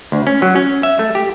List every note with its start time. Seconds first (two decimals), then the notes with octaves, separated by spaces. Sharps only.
0.12 D2
0.27 C#4
0.42 F#3
0.56 C#4
0.83 E5
0.99 A3
1.15 G4